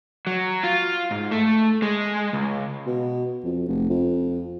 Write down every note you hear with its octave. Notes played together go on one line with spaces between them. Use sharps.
F#3
F4
G#2
A3
G#3
C#2
B2
F2
F1
F2